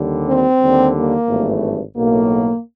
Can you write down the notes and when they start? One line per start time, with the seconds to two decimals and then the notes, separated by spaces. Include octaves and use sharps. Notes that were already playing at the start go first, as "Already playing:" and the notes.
Already playing: D#2 D3 G3
0.25 C4
0.58 D#2 D3 G3
0.92 A#3
1.27 G#1 G2 E3 A3
1.95 B1 A2 F#3 A#3